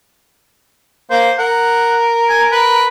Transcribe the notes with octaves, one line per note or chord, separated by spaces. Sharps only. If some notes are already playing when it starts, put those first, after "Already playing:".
A#3 C5
A#4 F#5
G#5
B4